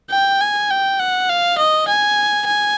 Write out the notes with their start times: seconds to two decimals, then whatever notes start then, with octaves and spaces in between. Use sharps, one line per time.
0.10 G5
0.41 G#5
0.70 G5
1.00 F#5
1.29 F5
1.58 D#5
1.88 G#5
2.47 G#5